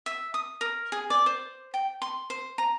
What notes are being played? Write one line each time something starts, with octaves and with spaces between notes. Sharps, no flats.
E5
D#6
A#4
G#4
D5
C5
G5
C6
C5
A#5